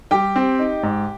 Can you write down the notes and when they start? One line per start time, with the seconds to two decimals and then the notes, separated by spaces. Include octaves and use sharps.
0.11 G3 G4 G5
0.36 C4
0.59 D#4
0.83 G#2